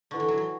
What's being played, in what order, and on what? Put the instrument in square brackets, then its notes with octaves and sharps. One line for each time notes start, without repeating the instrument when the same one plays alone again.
[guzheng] D3 [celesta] E4 B4 F#5 C#6
[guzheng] E3
F#3
E3